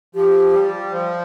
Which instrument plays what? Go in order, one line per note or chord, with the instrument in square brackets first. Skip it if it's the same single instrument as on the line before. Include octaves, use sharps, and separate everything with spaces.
[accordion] F3 [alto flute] G4
[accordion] G3
F3